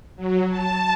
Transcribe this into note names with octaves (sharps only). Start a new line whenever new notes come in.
F#3
A5